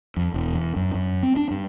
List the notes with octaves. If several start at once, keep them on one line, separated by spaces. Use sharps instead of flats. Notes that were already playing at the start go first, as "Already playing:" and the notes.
F2
E1
E2
F#2
F#2
C4
D4
G2